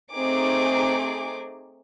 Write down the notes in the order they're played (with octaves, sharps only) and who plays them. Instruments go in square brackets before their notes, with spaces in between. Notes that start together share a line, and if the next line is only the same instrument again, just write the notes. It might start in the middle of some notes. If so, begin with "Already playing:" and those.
[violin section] A3 C4 D#4 G#4 D6